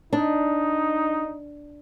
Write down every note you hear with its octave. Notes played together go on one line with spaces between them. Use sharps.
D4 D#4